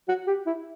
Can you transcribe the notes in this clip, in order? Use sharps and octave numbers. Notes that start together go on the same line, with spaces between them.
F#4
G4
E4